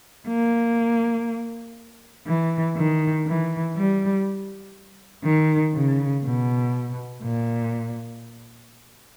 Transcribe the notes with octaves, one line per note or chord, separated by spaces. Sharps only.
A#3
E3
D#3
E3
G3
D#3
C#3
B2
A#2